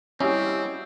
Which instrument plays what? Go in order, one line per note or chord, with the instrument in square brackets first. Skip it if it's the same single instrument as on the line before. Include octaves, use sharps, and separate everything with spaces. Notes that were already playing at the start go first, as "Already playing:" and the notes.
[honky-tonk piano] G3 E4 [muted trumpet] C4 [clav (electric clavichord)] C#4 [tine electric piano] F#4 G4 D#5